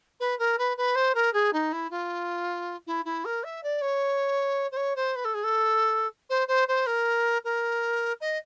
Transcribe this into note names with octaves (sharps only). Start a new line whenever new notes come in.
B4
A#4
B4
B4
C5
A#4
G#4
D#4
E4
F4
E4
E4
A#4
E5
D5
C#5
C5
C#5
C5
B4
A4
G#4
A4
C5
C5
C5
A#4
A#4
D#5